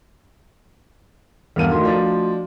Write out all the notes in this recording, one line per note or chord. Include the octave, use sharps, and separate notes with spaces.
E2 G2 A4 A#4 F5 D#7
D#3 A3 F#4 C6
F3 D4